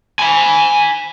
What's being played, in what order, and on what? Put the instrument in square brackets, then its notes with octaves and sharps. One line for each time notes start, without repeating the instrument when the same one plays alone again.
[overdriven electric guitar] G#5 B5